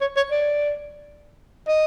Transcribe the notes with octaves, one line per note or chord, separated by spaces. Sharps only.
C#5
C#5
D5
D#5